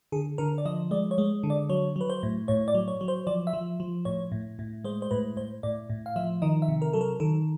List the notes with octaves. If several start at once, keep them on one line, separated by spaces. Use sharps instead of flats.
D3 G#4
D3 A#4
D5
F3 D#5
G#3 D5
C#5
G#3
D3
D5
F#3 C#5
F#3 B4
C5
A2
A2 C#5
D5
F#3
C#5
F#3
C5
F3 D5
E5
F3
F3
A2 C#5
A2
A2
G#3 C5
C5
A2 B4
A2 C5
A2 D5
A2
F5
F3 E5
D#3 D#5
E5
C3
A#4
F#3 A4
A#4
D#3 A4